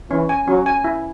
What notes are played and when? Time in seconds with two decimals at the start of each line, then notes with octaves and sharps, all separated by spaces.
0.10 E3 C#4
0.29 G#5
0.47 F#3 C#4
0.66 G#5
0.84 E4